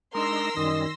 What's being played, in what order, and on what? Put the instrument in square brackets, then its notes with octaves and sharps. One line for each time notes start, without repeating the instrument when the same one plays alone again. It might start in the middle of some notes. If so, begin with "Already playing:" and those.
[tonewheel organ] G#3 D4 D#4 [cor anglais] A#4 [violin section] C6 E6 A#6
[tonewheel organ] F#2 G3 C#4 [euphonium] D#3 [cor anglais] D#5